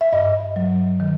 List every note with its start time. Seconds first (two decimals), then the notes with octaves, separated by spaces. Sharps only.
0.01 E5
0.13 G2 D#5
0.56 F#3
1.00 D#3